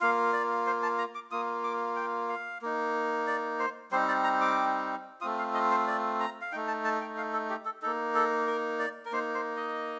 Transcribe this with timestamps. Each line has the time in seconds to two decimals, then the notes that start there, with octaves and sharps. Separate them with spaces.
0.01 A#3 F4 F5
0.33 D5
0.67 C5
0.83 A5
0.98 A#5
1.15 D6
1.31 A#3 F4 D#6
1.64 D6
1.96 G5
2.29 F5
2.62 A#3 D#4
3.27 D5
3.60 C5
3.92 G3 C4 D#4 C5
4.08 D5
4.24 A#5
4.41 D6
5.21 A3 C4 F4 D#6
5.39 F5
5.54 D#5
5.71 C5
5.87 D5
6.20 A#5
6.41 F5
6.52 A3 D#4 G5
6.68 A5
6.84 A5
7.01 G5
7.17 F5
7.33 A4
7.49 G4
7.65 A4
7.82 A#3 D#4 A4
8.15 A4
8.47 A#4
8.79 D5
9.05 A#4
9.12 A#3 D#4 C5
9.35 C5
9.56 D#5